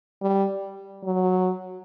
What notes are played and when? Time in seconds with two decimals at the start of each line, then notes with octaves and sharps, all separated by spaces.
0.22 G3
1.04 F#3